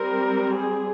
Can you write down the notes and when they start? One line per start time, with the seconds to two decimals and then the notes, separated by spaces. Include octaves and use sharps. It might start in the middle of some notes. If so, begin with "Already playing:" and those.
Already playing: G3 C4 A#4
0.54 G#4